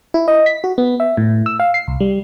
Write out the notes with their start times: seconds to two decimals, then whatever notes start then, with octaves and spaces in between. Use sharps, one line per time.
0.14 E4
0.28 D#5
0.46 B6
0.64 F#4
0.78 B3
1.00 E5
1.17 A2
1.46 E6
1.60 F5
1.74 C7
1.88 C2
2.00 G3